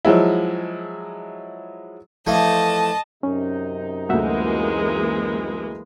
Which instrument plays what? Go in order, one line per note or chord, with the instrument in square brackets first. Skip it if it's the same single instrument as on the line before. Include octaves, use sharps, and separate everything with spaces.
[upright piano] F3 F#3 G#3 E4
[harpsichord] E3 F3 A3 [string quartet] D#5 A5
[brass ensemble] F#2 C3 D#4 [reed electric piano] C#4
[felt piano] D2 F#3 [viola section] E3 G#3 A#3 [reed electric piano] F#4 E5 F#5